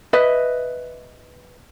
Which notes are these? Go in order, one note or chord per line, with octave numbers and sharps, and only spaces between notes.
B4 D#5 E5